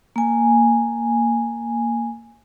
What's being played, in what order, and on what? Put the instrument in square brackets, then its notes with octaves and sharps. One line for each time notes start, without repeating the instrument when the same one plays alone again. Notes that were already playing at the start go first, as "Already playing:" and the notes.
[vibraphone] A#3 G#5